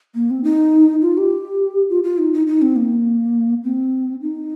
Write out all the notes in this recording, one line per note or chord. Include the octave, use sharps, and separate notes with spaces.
A#3
C4
D#4
F4
G4
F4
F4
D#4
D#4
D#4
C4
A#3
C4
D#4